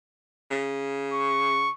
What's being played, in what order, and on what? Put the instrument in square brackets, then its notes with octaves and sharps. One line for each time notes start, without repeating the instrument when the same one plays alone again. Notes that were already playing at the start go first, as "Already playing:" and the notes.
[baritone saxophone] C#3
[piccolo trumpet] C#6